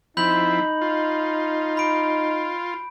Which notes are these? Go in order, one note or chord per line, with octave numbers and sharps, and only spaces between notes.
F3 C4 D#4 E4 B5 G6 F#7
F4
B5 D7